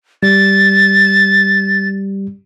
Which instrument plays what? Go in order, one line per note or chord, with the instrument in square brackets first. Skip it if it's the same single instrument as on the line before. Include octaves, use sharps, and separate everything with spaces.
[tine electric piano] G3 [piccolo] A6